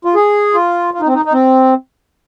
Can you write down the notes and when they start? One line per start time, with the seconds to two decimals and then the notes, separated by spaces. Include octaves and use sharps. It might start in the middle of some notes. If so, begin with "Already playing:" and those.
0.05 F4
0.15 G#4
0.54 F4
0.94 F4
1.01 D#4
1.07 C4
1.14 D#4
1.25 D#4
1.33 C4